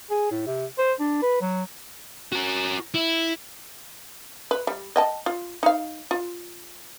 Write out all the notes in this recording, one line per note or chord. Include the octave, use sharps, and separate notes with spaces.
G#4
A2
C3
C5
D4
B4
F#3
F#4 A#4
E4
B4
G3
D#5 G5 A5
F4
D#4 F5
F4